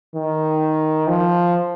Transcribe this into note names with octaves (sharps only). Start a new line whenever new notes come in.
D#3
F3